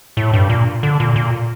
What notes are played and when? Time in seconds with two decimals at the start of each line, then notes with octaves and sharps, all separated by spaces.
0.17 A2
0.33 G2
0.49 A#2
0.83 D3
1.00 A#2
1.16 A#2